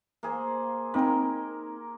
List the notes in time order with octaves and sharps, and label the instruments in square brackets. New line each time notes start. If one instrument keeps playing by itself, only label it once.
[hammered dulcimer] A#3 G#4 C5
[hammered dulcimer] A#3 A#4 [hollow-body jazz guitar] C4 D#4 B5